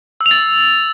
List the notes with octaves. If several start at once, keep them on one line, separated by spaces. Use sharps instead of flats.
E6
F7
A6